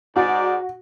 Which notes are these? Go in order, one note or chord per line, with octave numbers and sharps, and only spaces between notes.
G#2 F#4 D5